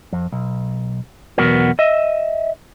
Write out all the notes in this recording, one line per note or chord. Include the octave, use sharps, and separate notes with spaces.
F2
B1
B1 E2 B3 F#4 A#4
D#5 E5